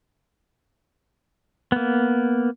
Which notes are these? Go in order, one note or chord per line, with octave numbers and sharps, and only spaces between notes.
A#3 B3